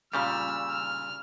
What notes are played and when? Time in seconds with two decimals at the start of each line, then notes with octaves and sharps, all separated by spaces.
0.13 A#2 C#3 G3 E6 F6
0.71 F6